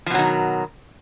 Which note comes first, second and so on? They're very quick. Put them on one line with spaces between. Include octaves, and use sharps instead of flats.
F3 B2 F#3 D#3